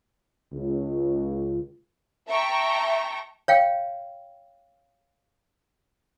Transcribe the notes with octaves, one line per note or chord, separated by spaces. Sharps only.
C#2
E5 G5 A5 A#5 C#6
C#5 F5 G5